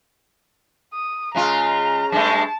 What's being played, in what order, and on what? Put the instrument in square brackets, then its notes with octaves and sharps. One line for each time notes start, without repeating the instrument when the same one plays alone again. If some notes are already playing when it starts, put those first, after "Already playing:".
[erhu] D#6
[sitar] C#3 G#3 F4 [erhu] A#5
[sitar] G2 G#3 A3 [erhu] A5